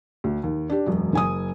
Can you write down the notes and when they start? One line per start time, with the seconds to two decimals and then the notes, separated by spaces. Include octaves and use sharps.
0.24 D2
0.43 D#2
0.70 D4 G4
0.87 E1 F#2
1.13 F#1 G#5 D#6